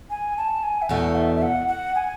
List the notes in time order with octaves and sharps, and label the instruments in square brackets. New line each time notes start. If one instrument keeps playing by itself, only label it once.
[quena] G#5
A5
G#5
E5
[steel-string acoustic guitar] E2 B2 A3 [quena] F#5
[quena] E5
E5
F#5
F#5
G#5